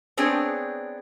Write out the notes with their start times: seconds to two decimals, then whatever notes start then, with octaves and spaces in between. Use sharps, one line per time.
0.17 B3 C4 D4 G#4 C5 C#5